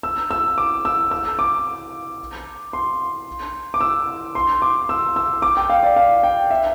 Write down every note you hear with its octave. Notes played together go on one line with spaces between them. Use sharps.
E6
E6
D6
E6
E6
D6
C6
D6
E6
C6
D6
E6
E6
D6
G5
F5
D5
F5
G5
E5